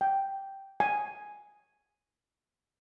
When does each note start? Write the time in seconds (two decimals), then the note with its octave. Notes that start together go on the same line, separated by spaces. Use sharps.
0.01 G5
0.80 G#5